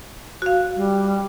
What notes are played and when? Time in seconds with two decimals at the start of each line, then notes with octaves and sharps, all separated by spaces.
0.42 F#4 F5
0.76 G3